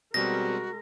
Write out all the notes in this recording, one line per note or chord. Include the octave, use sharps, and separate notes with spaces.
B2 G3 G#3 C4 F#4 A#4 A#6